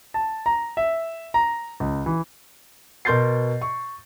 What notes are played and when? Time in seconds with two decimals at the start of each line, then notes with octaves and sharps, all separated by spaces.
0.14 A5
0.46 A#5
0.77 E5
1.34 A#5
1.80 C#2
2.06 E3
3.05 B2 A#4 C6 G6 A6 C7
3.61 C#6